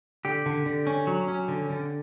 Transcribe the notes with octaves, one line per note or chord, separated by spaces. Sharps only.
D3 G4
D3
D3
C#4
F#3
C#4
D3
D3